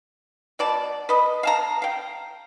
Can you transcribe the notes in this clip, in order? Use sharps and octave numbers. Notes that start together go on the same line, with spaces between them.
B2 D5 A5
B4 D#5
F5 A5 A#5
F5 G5